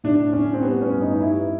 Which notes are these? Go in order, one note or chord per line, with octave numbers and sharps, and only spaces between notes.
A2 D4
A2 C#4
C4
G3 B3
C#4
G2
D#4
D#4
G3 E4